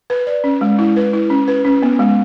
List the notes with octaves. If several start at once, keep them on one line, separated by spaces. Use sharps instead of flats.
B4
D5
C#4
G#3
E4
B4
E4
C#4
B4
C#4
B3
G#3